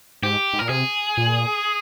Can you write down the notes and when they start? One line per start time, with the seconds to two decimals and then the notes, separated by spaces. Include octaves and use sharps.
0.23 G#2 G4
0.53 G#2
0.59 A#2 A#4
0.69 C3 G#4
1.17 A#2